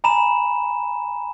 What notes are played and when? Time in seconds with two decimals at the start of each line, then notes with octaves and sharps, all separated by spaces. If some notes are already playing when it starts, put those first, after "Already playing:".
0.04 G#5 A#5 B5 E7